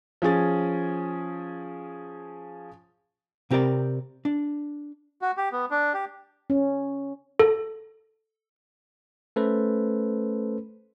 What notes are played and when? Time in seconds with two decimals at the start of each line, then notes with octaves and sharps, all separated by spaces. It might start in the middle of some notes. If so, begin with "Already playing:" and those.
0.22 F3 C#4 G#4 A6
3.51 C3 C4 G4 A#4 D5
4.25 D4
5.22 F#4
5.37 G4
5.52 B3
5.71 D4
5.94 G4
6.50 C#4
7.39 A4
9.36 A3 C#4 A4 B4 C5